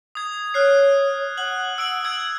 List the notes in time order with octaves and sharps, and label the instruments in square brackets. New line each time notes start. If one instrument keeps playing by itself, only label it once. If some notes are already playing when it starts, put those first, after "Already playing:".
[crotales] D#6 G#6
[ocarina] C#5 [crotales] F6 F#6 C7
[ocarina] F#5 [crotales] F#6 F#7
[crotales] E6 D7 F#7
E6 G#6 D7